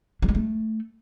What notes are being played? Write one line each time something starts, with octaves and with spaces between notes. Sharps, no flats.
F#3
G#3
A3